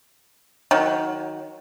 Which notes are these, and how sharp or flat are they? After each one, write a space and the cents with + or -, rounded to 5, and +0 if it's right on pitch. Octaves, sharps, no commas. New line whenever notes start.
D#3 +15 F#3 +0